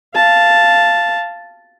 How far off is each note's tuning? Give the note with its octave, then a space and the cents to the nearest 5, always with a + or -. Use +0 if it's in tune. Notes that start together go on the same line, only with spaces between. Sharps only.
F5 -10 A5 +0